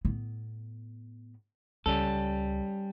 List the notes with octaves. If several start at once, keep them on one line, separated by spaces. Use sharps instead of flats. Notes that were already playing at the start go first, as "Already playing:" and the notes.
A2 B3
C#2 G3 C#4 A4